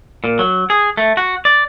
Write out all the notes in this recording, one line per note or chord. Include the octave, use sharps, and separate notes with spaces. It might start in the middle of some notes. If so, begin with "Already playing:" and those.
A#2
F#3
G#4
A3
F#4
D5